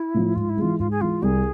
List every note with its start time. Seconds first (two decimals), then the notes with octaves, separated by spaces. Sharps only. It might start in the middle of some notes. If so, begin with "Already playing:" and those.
Already playing: E4
0.14 A2 F3
0.36 G#2 F4
0.49 E4
0.57 E3 G#3 F4
0.79 G#2 F4
0.91 G#4
1.01 E3 G#3 F4
1.22 C2 G#4